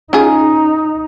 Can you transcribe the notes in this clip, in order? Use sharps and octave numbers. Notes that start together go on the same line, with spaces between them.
C#4 D#4 F4 G#4